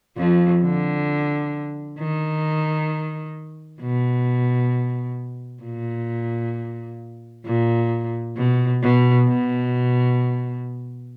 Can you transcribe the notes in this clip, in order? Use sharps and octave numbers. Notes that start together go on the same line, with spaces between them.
F2 F3
D3
D#3
B2
A#2
A#2
B2
B2
B2